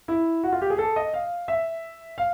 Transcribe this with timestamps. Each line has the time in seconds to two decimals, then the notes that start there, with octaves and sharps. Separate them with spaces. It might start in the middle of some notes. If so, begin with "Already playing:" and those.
0.08 E4
0.43 F#4
0.52 F4
0.61 G4
0.70 G#4
0.78 A4
0.96 D#5
1.14 F5
1.48 E5
2.18 F5